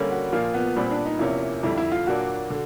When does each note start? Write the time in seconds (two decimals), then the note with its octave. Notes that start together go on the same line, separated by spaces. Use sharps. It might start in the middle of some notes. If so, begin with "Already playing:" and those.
Already playing: D3 G3 A#3 C#4
0.11 F#4
0.32 A#2 F3 A#3 F4
0.54 B3
0.76 A#2 G3 B3 C4
0.91 D4
1.06 D#4
1.19 E2 C3 F3 A#3 C#4 E4
1.63 F2 D3 G3 E4
1.77 E4
1.92 F4
2.07 A#2 F#3 A#3 D4 F#4
2.50 D3